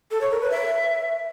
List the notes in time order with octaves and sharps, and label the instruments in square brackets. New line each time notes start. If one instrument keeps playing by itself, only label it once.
[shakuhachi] A4
C#5
A#4
B4
E5